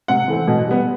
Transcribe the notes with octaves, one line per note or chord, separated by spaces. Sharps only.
C3 F#5
E3 A3 C4
B2
G3 B3